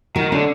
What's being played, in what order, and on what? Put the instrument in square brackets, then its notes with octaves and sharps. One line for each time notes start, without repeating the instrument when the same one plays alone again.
[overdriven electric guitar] D#3 [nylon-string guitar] F#4
[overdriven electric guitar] D3 [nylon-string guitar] C#4